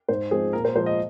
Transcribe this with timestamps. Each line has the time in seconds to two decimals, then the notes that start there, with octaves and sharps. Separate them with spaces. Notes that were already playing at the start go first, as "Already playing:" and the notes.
0.09 G#2 C5
0.31 F3 G#3 C4 G#4
0.53 A#2 A#4
0.65 C5
0.75 F3 G#3 C5
0.86 D#5